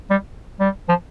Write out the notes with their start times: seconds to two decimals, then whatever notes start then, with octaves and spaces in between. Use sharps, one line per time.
0.10 G3
0.60 G3
0.89 F3